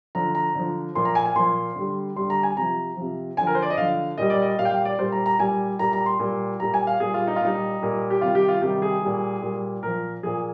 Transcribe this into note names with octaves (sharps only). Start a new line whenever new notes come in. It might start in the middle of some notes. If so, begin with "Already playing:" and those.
D3 F3 A#5
A#5
D3 F3
A#2 F3 C6
A#5
G#5
G#5
A#2 F3 C6
D3 G3
D3 G3 C6
A#5
G#5
C3 F3 A#5
C3 F3
D3 F3 G#5
A#4
C5
D5
D#5
D3 F3 F5
A#2 G3 D#5
D5
D#5
A#2 G3 F5
G5
F5
D5
A#2 G3 C5
A#5
A#5
A#2 G3 G#5
A#2 G3 A#5
A#5
C6
A#2 G3
A#2 G3 A#5
G#5
F5
A#2 G3 G#4
F4
D#4
F4
A#2 G3 D#4
A#2 G3
G4
C3 D#3 G3 F4
G4
F4
C3 D#3 G3 G4
G#4
A#2 G3
A#2 G3
A#2 F3 A#4
A#2 F3 G#4